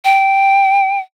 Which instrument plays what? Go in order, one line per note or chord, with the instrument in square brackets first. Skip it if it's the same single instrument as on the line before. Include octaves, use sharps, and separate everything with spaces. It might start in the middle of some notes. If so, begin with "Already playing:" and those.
[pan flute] G5